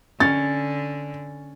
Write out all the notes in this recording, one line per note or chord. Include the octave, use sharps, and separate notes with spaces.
D3 C#4 A6